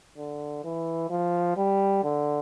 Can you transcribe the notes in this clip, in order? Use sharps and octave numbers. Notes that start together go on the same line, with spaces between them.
D3
E3
F3
G3
D3